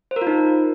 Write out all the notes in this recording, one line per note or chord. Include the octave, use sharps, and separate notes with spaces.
C5
A#4
F4
D#4